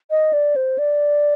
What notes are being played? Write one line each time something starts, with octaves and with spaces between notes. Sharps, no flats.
D#5
D5
C5
D5